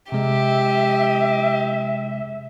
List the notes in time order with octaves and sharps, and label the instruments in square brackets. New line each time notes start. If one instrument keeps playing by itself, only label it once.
[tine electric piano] C3 G#3 [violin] G4 [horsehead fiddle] E5